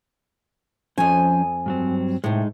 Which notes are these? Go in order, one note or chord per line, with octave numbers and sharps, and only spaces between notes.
F2 F3 C#4 C5 G#5
G2 F#3 C4
A2 C3 G#3 D#4